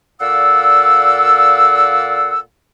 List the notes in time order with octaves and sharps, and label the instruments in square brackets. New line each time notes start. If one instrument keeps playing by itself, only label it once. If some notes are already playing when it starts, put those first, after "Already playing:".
[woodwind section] A#2 A4 D5 F5 F#5 E6